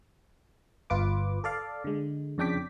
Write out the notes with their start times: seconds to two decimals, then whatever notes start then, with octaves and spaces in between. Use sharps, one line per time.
0.90 G1 F4 B4 D6
1.44 A4 D5 F5
1.84 D3 G#3
2.38 F2 C#3 D4 G5 D6 B6